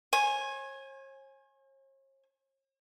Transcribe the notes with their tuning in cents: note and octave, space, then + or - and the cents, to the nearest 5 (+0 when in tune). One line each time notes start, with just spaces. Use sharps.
C#5 -45 G#5 +0